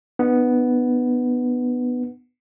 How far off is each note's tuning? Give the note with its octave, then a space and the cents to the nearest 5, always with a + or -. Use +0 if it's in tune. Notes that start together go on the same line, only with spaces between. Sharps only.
B3 +0 D4 +45